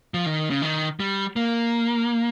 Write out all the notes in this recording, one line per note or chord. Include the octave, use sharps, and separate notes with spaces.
F3
D#3
C#3
D#3
G3
A#3